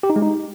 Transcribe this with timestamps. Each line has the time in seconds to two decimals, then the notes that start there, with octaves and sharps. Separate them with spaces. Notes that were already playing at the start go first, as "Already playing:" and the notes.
0.03 G4
0.10 D#4
0.16 G#3
0.22 D#4